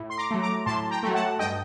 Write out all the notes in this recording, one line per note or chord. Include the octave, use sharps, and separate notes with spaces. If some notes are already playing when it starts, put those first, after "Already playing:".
Already playing: A2
C6
A#5 D6
F#3 A3
A#5 D6
A2 A5 C6
G5 A#5
F#3 A3
F#5 A5
G2 D#5 G5